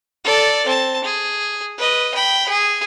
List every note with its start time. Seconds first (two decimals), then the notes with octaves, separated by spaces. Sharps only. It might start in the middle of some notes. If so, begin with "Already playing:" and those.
0.24 A4 D5
0.66 C4 A5
1.04 G#4
1.77 B4 D#5
2.14 G5 B5
2.49 G#4